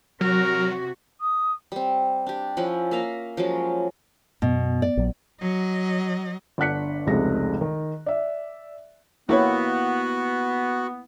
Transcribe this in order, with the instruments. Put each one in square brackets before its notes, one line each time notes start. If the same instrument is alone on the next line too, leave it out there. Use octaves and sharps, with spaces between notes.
[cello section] C3 F#4 [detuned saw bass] F#3 [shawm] A#4
[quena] D#6
[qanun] G3 C4
D4 G4
F3 C#4 E4 F#5
A#3 E5 F5 A#5
F3 F#3 G#3 C#4
[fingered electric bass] F#2 [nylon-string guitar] B2
[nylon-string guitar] D5
[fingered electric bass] A#1 F#3
[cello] F#3 D#5
[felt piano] G1 D4 F#5 F#6 B6 C#7
F1 C#2 C3 G#3 A#6
D#3
D5 E5
[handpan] A#3 E4 [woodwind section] B3 [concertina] F#4 [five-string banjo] G4 B4 C#5